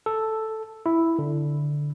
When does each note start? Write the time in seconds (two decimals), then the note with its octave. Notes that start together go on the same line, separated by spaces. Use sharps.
0.06 A4
0.86 E4
1.19 D3